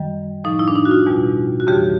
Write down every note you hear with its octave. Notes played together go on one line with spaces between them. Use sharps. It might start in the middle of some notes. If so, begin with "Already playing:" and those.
Already playing: F#2 D#3 G3
A2 F3 D#4
E4
D4
D#4
F#4
F4
E2 B2 G3
F#4
F2 C#3 E3 G3 G4